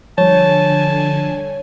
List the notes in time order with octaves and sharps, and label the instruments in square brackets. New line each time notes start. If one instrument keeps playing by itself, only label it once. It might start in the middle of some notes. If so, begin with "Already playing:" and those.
[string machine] D3 G#5 [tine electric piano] F3 G3 [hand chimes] C#5 [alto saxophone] A5